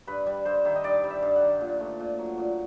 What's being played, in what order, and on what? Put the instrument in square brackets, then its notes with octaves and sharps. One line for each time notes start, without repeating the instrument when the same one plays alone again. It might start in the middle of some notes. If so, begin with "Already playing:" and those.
[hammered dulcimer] G2 B4
G3
G2 C5
D#3 E5
D#5
G2 D5
G3
E5
G2
F#5
D#3
A#2
A3
A#2
F#3
A#2